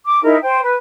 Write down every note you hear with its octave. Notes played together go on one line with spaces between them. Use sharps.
D6
D#4 E4 G#4 A#4
C5 G5
B4